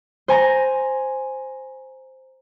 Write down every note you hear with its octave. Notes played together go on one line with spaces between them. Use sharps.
C5 G#5 A#5 A#6